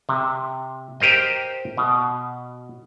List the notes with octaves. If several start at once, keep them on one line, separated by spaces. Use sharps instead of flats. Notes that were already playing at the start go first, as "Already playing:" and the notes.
C3
G4 A#4 C5 D#5
B2